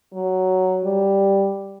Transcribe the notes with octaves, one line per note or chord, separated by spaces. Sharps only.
F#3
G3